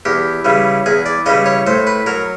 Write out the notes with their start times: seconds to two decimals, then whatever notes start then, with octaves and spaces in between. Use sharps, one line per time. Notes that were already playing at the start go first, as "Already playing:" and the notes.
0.05 E2 G4
0.45 C#3 E3 G3
0.86 E2 G#4
1.06 D5
1.26 C#3 E3 G3 D#5
1.46 C#5
1.67 A2 C5
1.87 B4
2.06 F#3 A#4